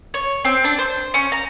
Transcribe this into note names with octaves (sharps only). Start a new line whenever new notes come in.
C#5
C4
D4
C5
C#4
A#5